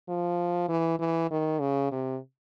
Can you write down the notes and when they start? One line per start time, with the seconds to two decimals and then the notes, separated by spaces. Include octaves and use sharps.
0.09 F3
0.69 E3
0.99 E3
1.31 D#3
1.60 C#3
1.92 C3